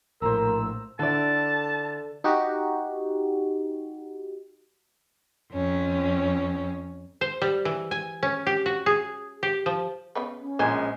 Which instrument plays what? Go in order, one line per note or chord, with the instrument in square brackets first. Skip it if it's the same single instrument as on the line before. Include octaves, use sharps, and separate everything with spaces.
[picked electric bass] A#1 A2 [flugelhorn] A#4 [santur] C5 A#5 [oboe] E6
[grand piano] D3 E4 [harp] A4 D5 [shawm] A5
[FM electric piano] D#4 F#4 G4
[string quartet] F2 C#4
[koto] C5
G3
E3
G#5
C#4
G4
F#4
G#4
G4
F3
[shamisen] C#3 B3 B4
[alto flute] C#4
[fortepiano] A#1 G#5 [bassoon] G#3 [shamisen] C5